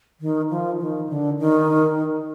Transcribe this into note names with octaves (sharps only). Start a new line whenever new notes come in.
D#3
F3
D#3
D3
D#3